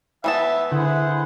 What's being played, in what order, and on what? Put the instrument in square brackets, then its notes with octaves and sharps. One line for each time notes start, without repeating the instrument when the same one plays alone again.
[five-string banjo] E3 B3 A5 [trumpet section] E5
[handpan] D3 [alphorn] E4 [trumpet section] G#4 C5 F#5